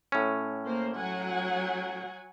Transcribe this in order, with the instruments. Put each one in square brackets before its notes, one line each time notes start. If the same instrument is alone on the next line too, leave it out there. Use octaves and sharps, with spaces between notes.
[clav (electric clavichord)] A2 C#4
[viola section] A#3 C5
F#3 F#5 G#5